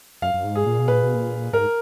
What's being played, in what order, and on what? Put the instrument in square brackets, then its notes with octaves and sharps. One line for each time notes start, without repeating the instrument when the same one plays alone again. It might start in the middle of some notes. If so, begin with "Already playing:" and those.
[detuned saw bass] F#2 [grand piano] F5
[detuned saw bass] F#2
G#2
[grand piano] G#4
[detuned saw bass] A#2
B2
[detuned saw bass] A#2 [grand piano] B4
[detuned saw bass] B2
A#2
[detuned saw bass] G#2 [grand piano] A#4